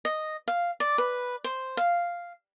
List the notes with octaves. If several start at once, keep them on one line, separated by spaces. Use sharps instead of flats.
D#5
F5
D5
B4
C5
F5